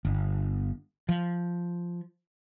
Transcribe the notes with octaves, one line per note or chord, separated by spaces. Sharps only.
G1
F3